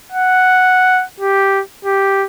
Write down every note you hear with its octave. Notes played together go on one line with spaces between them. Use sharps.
F#5
G4
G4